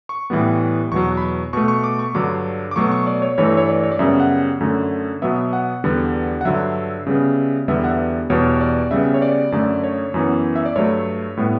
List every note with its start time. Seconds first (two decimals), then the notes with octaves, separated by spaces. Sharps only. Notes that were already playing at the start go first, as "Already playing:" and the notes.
0.09 C#6
0.30 A2 E3 G3 B3
0.92 E2 B2 F#3 C#6
1.17 B5
1.22 C#6
1.53 B2 A3 C#6
1.68 C#6
1.84 D6
1.99 C#6
2.15 G2 D3 F#3 D6
2.71 D6
2.76 B2 F#3 A3 C#6
2.92 C#6
3.07 D5
3.22 C#5
3.38 G2 E3 A3 C#5
3.57 C#5
3.68 D5
3.83 C#5
3.92 D5
3.99 F#2 C#3 G3 B3 E5
4.20 F#5
4.60 F#2 D3 A3
5.22 B2 F#3 B3 E5
5.53 F#5
5.84 E2 D3 G3 B3
6.41 F#5
6.45 G2 D3 F#3 E5
7.07 C#3 G3 B3
7.68 E2 D3 G3 B3 E5
7.84 F#5
7.88 E5
8.30 E2 B2 G3 C#5
8.61 D5
8.91 C#3 G3 B3 E5
9.14 C#5
9.22 D5
9.52 F#2 D3 A3 D5
9.84 C#5
10.14 F#2 E3 B3
10.56 E5
10.66 D5
10.76 G2 F#3 A3 C#5
11.37 A2 G3 B3